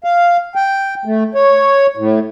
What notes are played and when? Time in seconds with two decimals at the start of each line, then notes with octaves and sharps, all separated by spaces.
0.04 F5
0.55 G5
1.05 A3
1.35 C#5
1.97 A2